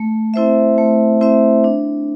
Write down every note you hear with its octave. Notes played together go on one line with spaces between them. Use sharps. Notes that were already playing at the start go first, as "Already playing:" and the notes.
Already playing: A3
C4 E4 C5 E5
A3
C4 E4 C5 E5
D4